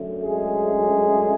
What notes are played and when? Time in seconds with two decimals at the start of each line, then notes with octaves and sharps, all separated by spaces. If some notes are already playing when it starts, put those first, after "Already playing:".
Already playing: F#2 D3 A3
0.22 G#3 G#4